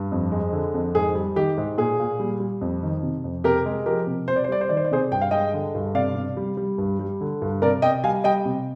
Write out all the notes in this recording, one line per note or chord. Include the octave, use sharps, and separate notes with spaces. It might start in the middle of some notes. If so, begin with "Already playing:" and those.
Already playing: G2
F2
G#3
D3
F2
G#2 G#4
G3
D#3 G4
G#2
A#2 G#4
A#2
G3
G3
F2
D#3
C3
F2
C3 G4 A#4
G#3
F3 G4 A#4
C3
C3 C5
D5
C5
G3 D5
C5
D#3 D5
C5
D5
C3 G#4 C5
G2 G5
F5
G#3 D#5 G5
D3
G2
C3 D5 F5
C3
G3
G3
G2
G3
D3
G2
C3 A#4 D5
C3 D#5 G5
G3 F5 G#5
G3 D#5 G5
C3